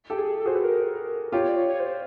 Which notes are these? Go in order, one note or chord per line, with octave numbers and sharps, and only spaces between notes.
G4 A4
G#4
A4
F#4 G#4 C5
B4
A#4
F4 G4 C#5
D5
C#5
C#5
C5